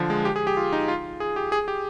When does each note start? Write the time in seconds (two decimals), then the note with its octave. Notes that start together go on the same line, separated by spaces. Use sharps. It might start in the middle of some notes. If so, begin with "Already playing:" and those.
Already playing: D3 F3
0.10 G#3
0.25 G4
0.36 G#4
0.47 G4
0.57 F4
0.73 D#4
0.88 F4
1.20 G#4
1.36 G4
1.52 G#4
1.68 G4